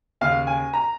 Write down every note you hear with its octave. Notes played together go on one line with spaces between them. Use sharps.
D#2 C#3 F5
G#5
A#5